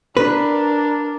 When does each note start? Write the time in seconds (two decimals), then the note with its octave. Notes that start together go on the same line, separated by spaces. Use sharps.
0.17 D4 A#4 B4